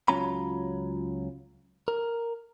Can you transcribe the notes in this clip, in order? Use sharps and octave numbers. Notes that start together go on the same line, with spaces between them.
C#2 F#3 C#4 F4 A#5 B5
A#4